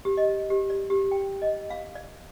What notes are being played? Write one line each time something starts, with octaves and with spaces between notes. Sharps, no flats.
G4
D#5
G4
D5
G4
G5
D#5
F5
D5